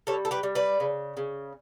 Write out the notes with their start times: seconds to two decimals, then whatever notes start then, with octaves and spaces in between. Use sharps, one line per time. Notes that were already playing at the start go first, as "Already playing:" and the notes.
0.07 G3 A4 C#5
0.25 A4
0.31 G4 B4
0.43 G3
0.55 B4 D5
0.80 C#3
1.17 C#3